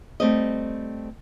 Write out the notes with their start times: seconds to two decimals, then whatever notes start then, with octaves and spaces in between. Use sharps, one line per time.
0.20 G3 A3 C4 D#5